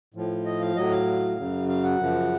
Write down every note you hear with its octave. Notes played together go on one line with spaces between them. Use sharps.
A2 F3
D#5
F5
A2 F#3 D#5
F5
F#2 C#3 F#3
F5
F#5
F#2 C#3 F3